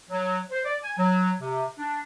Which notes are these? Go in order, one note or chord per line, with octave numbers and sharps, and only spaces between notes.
F#3
C5
D5
G#5
F#3
C3
D4